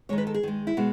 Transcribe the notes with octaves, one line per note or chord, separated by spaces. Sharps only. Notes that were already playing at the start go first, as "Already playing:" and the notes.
D#3 G#3 C#5
B4
A4
G#4
D#3 G#3
E4
B2 G#3 F#4